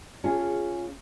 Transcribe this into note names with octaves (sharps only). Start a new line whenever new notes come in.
C#4 F4 G#4